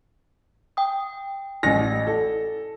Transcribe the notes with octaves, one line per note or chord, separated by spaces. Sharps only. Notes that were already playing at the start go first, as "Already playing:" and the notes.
G5 D#6
A1 E4 D5 G#5 A#6
A4